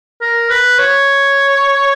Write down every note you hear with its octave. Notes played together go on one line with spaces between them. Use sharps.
A#4
B4
C#5